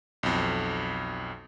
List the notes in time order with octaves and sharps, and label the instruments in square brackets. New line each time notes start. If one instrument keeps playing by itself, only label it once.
[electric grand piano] B1 F2